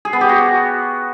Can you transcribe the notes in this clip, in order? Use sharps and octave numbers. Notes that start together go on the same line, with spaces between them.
G#4
B3
G4
F#4